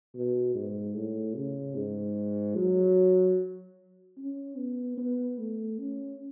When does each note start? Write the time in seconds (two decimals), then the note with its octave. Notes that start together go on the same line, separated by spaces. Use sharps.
0.15 B2
0.55 G#2
0.95 A2
1.35 C#3
1.76 G#2
2.55 F#3
4.18 C#4
4.57 B3
4.98 B3
5.38 A3
5.79 C#4